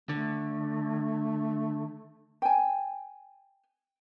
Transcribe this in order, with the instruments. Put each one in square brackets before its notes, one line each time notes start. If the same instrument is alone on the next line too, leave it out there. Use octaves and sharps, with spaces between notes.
[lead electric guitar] D3 [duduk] A3
[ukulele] G5 G#5